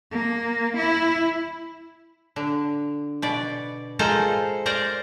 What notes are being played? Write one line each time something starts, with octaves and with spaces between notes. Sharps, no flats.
A#3
E4
D3
B2 D5
G#3 F4 A4 A#4 C5
A#4 C5 D5 A#5